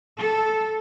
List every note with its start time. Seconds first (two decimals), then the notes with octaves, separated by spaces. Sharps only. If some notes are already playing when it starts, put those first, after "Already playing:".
0.20 A4